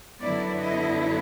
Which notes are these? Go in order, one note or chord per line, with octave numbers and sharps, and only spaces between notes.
F#2 D3 F#3 B3 E4 D5
D#5